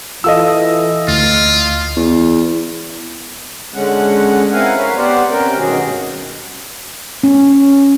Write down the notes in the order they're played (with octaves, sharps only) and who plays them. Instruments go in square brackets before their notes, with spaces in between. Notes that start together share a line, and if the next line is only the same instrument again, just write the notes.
[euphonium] E3 [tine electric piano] F4 A4 [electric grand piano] D#5 F5 E6
[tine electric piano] D2 [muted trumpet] F4
[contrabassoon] E2
[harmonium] D3 G#3 C#4 F#5
C4 E4 A#4 F5 F#5 G#5
A#4 B4 C#5 F5
B3 G4 C5 D5 F#5
C3 C#4 A#4 G5
G2 B2 D#3 C#4 F#4 G#4
[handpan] C#4